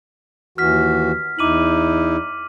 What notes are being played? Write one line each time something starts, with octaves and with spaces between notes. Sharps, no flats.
D#2 E3 F#4 F6 B6
E2 D#4 E4 D6 D#7 F#7